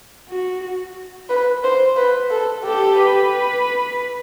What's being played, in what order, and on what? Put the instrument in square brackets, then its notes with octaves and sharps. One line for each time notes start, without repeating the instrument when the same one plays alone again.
[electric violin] F#4
[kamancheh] B4
C5
B4
A4
[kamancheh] G4 [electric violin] A4
[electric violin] B4